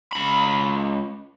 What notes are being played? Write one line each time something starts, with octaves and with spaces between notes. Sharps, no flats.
C#2 B5